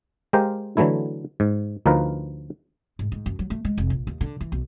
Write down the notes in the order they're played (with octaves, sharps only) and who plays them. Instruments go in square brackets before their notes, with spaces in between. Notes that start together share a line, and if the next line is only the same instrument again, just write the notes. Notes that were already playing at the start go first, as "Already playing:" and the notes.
[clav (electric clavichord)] G#3 G4 A#4 C5 F5 G5
D3 E3 F#3 A3 E4
G#2
D2 F3 D#4 A#4 B4 F5
[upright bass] G#2
G#2
F#2
F#3
A3
G#3
F1
A#1
D#2
D3
E3
B1